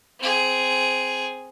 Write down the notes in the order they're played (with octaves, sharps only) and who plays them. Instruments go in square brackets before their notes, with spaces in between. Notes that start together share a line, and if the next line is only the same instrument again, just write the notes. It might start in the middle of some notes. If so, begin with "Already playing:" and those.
[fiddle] C4 G#4